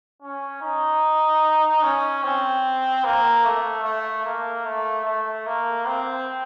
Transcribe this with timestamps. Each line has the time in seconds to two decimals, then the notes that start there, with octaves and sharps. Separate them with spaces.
0.22 C#4
0.62 D#4
1.83 C#4
2.23 C4
3.04 A#3
3.45 A3
3.84 A3
4.25 A#3
4.65 A3
5.05 A3
5.46 A#3
5.86 C4